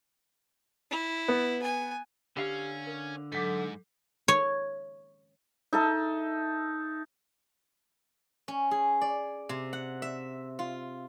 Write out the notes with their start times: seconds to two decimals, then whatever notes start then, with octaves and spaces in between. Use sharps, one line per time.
0.91 E4
1.28 B3
1.63 G#5
2.37 D3 C#4 G4 F5
2.87 A#4
3.32 G#2 F#3 A4 D6 G6 B6
4.28 C#5
5.73 D#4 A4 E5
8.48 C#4
8.71 G#4
9.01 D5
9.49 C3
9.73 F#5
10.02 E5
10.59 F4